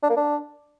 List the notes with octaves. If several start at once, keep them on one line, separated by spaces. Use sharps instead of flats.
D4
A#3
D4